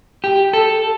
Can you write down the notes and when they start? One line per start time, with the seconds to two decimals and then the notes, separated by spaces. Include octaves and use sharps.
0.24 G4
0.53 A4